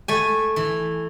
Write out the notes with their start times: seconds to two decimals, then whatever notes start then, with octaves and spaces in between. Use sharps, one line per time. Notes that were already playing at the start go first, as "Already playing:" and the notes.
0.08 A3 G#5
0.56 E3